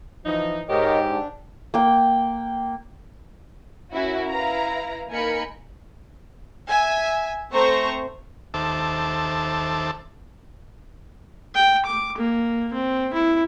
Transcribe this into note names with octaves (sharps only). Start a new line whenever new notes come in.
E3 F3 D#4
G#2 G4 A#4 C#5 D#5
D4
A#3 G5
A#3 C#4 E4 F#4
E4 B4 F5 A#5
A#3 D#4 A#4 G#5 B5 C#7
E5 G#5
A3 C4 C5 A#5 C#6
D#2 A4 C5 E5 A5 D6
G5
D6
A#3
C4
E4